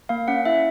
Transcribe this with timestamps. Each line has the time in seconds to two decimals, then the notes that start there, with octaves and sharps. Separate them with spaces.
0.09 A#3 F5
0.28 C#4 F#5
0.45 E4 E5